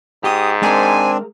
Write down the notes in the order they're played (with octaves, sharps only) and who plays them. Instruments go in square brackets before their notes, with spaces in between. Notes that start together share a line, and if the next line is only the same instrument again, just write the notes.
[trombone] G#2 [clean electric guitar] G4 [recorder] D#6
[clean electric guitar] G#3 A#4 [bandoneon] C4 D4 [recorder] G#5